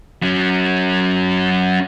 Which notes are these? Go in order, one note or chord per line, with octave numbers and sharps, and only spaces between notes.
F#3 C#4